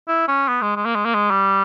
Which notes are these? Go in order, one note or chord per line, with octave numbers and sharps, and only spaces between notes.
E4
C#4
B3
G#3
G#3
A#3
G#3
A#3
G#3
G3